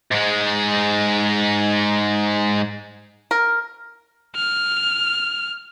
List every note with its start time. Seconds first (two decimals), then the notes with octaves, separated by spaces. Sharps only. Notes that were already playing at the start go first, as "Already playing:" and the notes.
0.12 G#2 G#3
3.31 A#4
4.36 F6